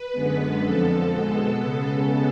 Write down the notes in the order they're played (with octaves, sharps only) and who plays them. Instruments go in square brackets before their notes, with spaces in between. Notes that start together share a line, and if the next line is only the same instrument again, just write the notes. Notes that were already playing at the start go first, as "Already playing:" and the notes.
Already playing: [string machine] B4
F#2 D3 G#3 B3
F2 D3 F3 A4
B2 G#3 B3 A4
C#3 G#3 B3 A4